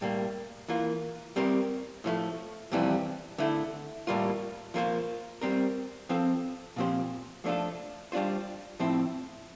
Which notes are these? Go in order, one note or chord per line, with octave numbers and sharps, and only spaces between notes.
A2 G3 A#3
E3 A#3 F4
G3 C4 G4 A#4
A2 F3 A3
F2 C3 E3 G3
D3 A3 E4
A2 G3 A#3 F4
F3 A#3 F4 A4 C5
G3 C4 G4 A#4
F3 C4 F4 A4
A#2 F3 C4 G4 C5
F3 A3 D4 F4 A4
G3 D4 F4 C5
A2 F3 C4 E4